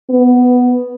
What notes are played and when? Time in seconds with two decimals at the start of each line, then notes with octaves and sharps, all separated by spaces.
0.10 B3